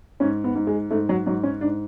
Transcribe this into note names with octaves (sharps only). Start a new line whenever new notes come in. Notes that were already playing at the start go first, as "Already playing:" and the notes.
G#2 C#4
B3
G#2
G#3
G#2 A3
F#3
G#2 F#3
C#4
G#2 D4